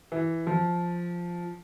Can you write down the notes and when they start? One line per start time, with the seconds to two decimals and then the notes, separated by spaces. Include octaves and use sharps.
0.12 E3
0.47 F3